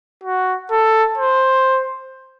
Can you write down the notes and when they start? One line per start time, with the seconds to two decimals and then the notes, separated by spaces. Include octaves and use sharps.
0.24 F#4
0.71 A4
1.18 C5